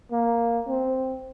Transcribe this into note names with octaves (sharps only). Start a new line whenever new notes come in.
A#3
C4